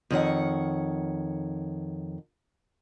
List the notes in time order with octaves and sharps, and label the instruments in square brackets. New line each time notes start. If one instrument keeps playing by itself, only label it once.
[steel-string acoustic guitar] F2 D#3 C#5 F#5